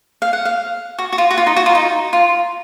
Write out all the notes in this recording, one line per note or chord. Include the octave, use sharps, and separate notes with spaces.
F5
F#5
F5
F#4
F#4
F4
F#4
F4
D#4
F#4
F4
D#4
F4